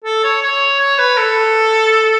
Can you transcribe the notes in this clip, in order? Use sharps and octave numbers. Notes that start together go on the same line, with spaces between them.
A4
C#5
C#5
C#5
B4
A4